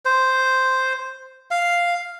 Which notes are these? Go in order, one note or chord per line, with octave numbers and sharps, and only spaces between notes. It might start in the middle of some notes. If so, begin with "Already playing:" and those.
C5
F5